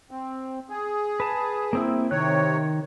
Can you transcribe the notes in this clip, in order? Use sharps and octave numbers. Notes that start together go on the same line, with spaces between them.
C4
G#4
B4 A5
A#3 C4 E4
C3 D#3 C#5 F#6